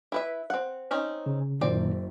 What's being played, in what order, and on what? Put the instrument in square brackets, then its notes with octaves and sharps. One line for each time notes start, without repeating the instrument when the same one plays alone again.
[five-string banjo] E4 B4 E5
C4 F#5
C4 C#4 D#4
[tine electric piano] C#3
[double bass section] F#1 [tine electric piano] A#2 D#3 [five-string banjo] C4 D5